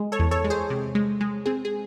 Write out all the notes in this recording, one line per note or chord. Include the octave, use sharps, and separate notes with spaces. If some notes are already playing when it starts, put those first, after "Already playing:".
Already playing: G#3
A4 C#5
E2
A4 C#5
G#3
G#4 C5
C3
G#3
G#3
C4 G#4
G#4